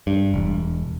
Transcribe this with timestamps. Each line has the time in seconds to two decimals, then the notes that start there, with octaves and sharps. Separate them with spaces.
0.07 G2
0.34 E1